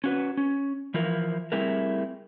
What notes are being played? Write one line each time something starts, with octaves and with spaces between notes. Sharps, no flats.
C#4 F#4 B4
C#4
E3 F3 E4 A#4
G3 A3 C4 E4 G#4 A#4